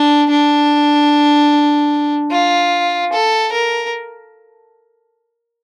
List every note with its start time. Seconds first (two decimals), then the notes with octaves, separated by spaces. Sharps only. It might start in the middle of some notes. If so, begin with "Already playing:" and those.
Already playing: D4
0.30 D4
2.31 F4
3.13 A4
3.52 A#4